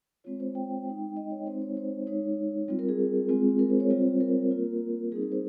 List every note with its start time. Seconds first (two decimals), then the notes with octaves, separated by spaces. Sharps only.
0.24 G#3 C4 F4 C#5
0.40 C5
0.55 G5
0.85 G#3 D#4
1.16 D#5
1.31 C#5
1.46 G#3 C4 D#4 C5
1.62 C#5
1.77 C5
2.07 G#3 D#4 C#5
2.68 G3 C4 F4
2.79 A#4
2.89 G#4
3.29 G#3 C4 F4
3.59 A#4
3.70 C5
3.80 C#5
3.90 G3 C4 F4 C5
4.21 A#4
4.51 A#3 F4
5.12 G3 C4 D#4 G#4
5.22 A#4
5.32 C5